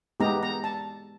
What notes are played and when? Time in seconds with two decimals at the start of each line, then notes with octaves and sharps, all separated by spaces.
0.20 G#3 B3 D#4 G4 A#5
0.43 A#5
0.64 A5